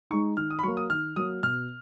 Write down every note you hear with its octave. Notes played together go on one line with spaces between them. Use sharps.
G#3 D#4 C#6
D#3 F6
D#6
B5
F#3 A#3 C#6
D#6
D#3 F6
F#3 A#3 D#6
B2 F6